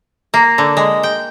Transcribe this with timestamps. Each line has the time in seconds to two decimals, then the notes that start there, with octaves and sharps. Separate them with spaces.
0.34 A#3
0.58 D3
0.77 G#3
1.03 G5